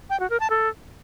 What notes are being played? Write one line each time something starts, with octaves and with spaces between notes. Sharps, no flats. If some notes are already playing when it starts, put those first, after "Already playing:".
G5
F#4
A#4
A5
A4